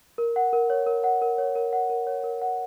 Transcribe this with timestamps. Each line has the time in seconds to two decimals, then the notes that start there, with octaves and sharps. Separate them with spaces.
0.18 A#4
0.36 F#5
0.53 A#4
0.70 C#5
0.86 A#4
1.04 F#5
1.22 A#4
1.38 C#5
1.56 A#4
1.73 F#5
1.90 A#4
2.07 C#5
2.24 A#4
2.42 F#5